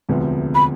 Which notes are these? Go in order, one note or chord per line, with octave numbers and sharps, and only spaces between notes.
E1 D2 C3 F3 B3
B5